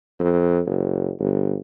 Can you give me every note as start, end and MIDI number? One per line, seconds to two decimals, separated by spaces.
0.20 0.60 41
0.66 1.11 30
1.19 1.56 31